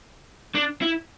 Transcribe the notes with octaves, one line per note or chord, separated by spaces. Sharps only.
D4
E4